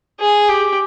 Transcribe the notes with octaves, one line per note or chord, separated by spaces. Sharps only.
G#4
G4